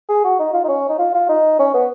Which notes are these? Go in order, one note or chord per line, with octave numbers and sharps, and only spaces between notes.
G#4
F#4
D#4
F4
D#4
C#4
D#4
F4
F4
D#4
C#4
B3